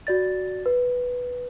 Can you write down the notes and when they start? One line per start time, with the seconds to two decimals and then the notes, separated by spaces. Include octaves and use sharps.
0.07 F#4 D5 A6
0.66 B4